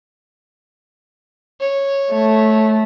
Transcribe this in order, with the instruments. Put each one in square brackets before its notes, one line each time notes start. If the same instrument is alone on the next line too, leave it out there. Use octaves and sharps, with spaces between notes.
[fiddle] C#5
[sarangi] A3